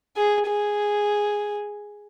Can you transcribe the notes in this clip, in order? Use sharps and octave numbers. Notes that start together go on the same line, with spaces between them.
G#4
G#4